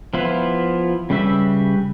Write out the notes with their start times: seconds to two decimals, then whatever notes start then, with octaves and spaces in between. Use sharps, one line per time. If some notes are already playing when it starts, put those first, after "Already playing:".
0.14 F3 B3 E4 F4 B4
1.10 C#3 G3 G4 B4 E5